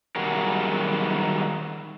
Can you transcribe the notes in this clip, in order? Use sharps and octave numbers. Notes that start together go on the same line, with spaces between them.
D#3 F#3 G3 F#4 G#4 A#4